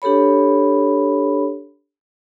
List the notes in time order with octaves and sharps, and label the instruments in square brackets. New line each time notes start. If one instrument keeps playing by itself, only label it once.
[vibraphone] D4 G4 A4 C#5 B5